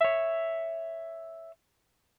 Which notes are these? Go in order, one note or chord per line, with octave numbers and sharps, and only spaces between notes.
C#5 E5